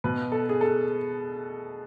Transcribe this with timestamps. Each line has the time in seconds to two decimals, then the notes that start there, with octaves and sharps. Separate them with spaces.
0.04 B2 B4
0.32 A4
0.49 G#4
0.61 A4